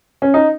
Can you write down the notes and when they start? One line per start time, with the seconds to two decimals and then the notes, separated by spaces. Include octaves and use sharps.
0.22 C#4
0.34 D#4